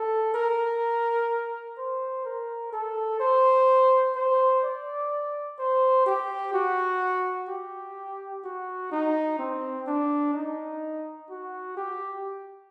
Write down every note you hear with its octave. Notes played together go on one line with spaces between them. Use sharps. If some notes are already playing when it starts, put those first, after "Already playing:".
Already playing: A4
A#4
C5
A#4
A4
C5
C5
D5
C5
G4
F#4
G4
F#4
D#4
C4
D4
D#4
F#4
G4